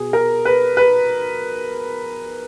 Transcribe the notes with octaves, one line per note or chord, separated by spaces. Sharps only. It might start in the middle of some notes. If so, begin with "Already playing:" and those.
Already playing: B2 G#4
A#4
B4
B4